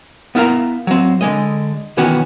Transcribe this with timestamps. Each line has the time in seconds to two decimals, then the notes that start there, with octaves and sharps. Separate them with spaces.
0.35 B3 E4 A#4 F5 A#5
0.87 F#3 C4
1.21 D3 G#3 D#5
1.97 B1 D#3 E3 B3 C#4 F#4